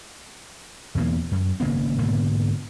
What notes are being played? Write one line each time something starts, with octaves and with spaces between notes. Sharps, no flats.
E2 B2 E3 A#3
F#2
G#1 C#3 A#3 B3
G#2 B2 D3 A#3